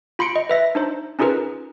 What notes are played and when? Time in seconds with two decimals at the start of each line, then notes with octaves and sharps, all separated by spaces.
0.19 F4 B5 C6 C#7 D7
0.36 D#5
0.49 B4 E5 A#6
0.75 D4 D#4 C5
1.19 C#4 D#4 F4 G#4 A#4 B4